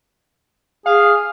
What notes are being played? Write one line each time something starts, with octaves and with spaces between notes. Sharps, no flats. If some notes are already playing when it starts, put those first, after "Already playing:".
G#4 F5